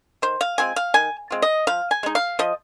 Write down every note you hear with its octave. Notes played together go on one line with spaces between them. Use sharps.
D#3 C5
F5
G#3 C4 F4 G#5
F5
D#3 G#5
G#3 C4 F4
D#5
F3 F5
G#5
G#3 D#4
F5
F3 D#5